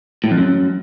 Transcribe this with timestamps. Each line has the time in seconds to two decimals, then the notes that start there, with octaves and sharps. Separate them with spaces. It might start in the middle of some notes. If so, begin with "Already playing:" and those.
0.24 A2
0.31 F2
0.38 F#2